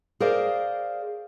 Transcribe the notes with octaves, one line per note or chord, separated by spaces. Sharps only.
G#4 A#4 C5 D5 D#5 F5